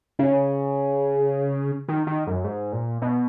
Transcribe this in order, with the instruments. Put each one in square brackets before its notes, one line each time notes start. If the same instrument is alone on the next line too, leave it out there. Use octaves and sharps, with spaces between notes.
[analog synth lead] C#3
D#3
D#3
F#2
G#2
A#2
B2